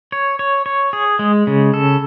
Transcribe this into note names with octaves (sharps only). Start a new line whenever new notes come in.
C#5
C#5
C#5
G#4
G#3
C#3
A4